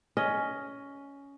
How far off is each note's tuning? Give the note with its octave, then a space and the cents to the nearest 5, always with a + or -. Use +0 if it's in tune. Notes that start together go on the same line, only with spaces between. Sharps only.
C#4 +10 D#5 +0